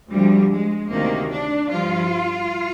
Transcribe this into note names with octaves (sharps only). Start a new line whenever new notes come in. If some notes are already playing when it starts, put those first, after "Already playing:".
D2 D3 F3 G3
G#3
D2 C3 D#3 A#3
D4
G2 F3 F4